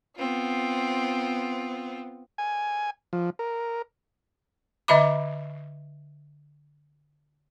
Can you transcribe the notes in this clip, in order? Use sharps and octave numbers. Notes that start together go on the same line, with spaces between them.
B3 C4 F4
G#5
F3
A#4
D3 D#5 E5 B5 D6